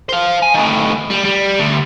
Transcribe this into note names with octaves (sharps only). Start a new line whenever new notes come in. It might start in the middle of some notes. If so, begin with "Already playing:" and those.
C5 F5
G#5
A2 D#3
G3
G3
D2